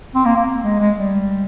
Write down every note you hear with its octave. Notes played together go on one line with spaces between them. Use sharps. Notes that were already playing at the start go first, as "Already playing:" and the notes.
C4
A#3
A#3
G#3
G#3
G3